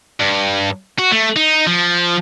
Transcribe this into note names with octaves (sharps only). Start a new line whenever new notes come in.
G2
F#4
A3
D#4
F3